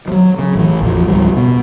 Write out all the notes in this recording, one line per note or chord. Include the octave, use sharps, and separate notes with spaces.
F3 F#3
C#3
A1 E3
A#1 F2 F3
C#2 G#2 F3 G3
B2